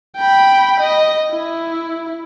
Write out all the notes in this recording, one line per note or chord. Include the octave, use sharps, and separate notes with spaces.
G5 B5
D#5
E4